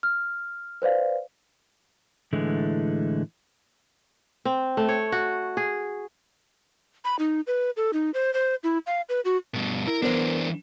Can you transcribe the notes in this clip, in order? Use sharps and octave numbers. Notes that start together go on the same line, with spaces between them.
F6
B4 C5 D5 F5
A2 D3 E3 G#3 A3
C4
A3
C#5
F#4
G#4
B5
D#4
B4
A4
D#4
C5
C5
E4
F5
B4
F#4
G2 B2
E4 A#4
E3 B3 D4 A#4 C5